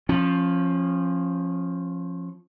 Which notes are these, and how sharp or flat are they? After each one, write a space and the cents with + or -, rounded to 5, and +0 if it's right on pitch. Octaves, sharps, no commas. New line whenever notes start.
F3 +0 C#4 -30